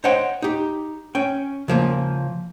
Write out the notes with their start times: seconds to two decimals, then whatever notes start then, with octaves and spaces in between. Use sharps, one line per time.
0.04 C5 C#5 D#5 F#5 G5 C6
0.42 D#4 G4
1.15 C#4 G5
1.68 C#3 F3 A#3